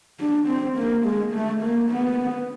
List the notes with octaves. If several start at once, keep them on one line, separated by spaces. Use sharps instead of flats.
D4
C4
A#3
G#3
A3
A#3
B3